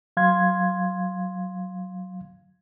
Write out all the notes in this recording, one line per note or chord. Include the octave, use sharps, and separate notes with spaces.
F#3 F5 C6 G#6